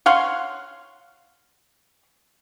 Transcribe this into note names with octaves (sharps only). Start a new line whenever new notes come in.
C#5 F5 F#5 C6